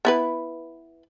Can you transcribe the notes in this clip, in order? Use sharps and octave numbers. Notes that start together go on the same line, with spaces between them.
B3 E4 B4